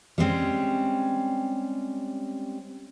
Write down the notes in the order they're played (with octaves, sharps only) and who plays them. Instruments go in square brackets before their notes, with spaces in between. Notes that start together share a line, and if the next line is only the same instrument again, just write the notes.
[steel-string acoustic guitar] G3 G#3 C4 C#4